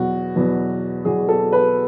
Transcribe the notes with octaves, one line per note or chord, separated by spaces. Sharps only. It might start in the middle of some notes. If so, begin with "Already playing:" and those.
Already playing: E2 B2 F#3 F#4
E2 B2 F#3
E2 B2 F#3 G#4
A4
B4